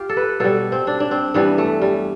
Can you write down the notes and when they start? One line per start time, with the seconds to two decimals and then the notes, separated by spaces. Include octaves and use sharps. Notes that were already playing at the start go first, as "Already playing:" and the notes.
Already playing: F4 G4
0.09 A4
0.17 B4
0.40 B2 G3 A4
0.72 C4
0.87 D4
1.00 D4
1.11 C4
1.34 G2 E3 G3 B3
1.58 A3
1.82 G3